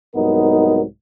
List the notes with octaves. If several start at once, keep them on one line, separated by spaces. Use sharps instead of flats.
C2 G#2 F#3 B3 D#4 A#4